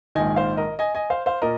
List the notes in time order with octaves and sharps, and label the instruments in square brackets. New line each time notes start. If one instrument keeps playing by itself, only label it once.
[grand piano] A#1 G#2 D#3 D#5 G#5
C5 F5
A#4 D#5
D#5 G#5
D#5 G#5
C5 F5
C5 F5
A#2 A#4 D#5